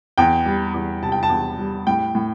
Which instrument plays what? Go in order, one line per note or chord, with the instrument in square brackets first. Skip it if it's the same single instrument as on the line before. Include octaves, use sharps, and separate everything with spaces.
[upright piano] E2 G5
G3
E2
C3 A5
G5
A5
E2
G3
A2 G5
A2